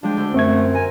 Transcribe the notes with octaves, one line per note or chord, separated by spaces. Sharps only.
F3 G#3 D4 G5
D2 G6
F#2 A3 C4 G#6
C5
A#4 G#5